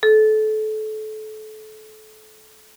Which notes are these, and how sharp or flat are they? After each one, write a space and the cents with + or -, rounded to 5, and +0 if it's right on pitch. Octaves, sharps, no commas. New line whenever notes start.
A4 -30